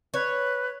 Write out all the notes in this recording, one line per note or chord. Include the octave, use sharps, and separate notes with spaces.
B4 C#5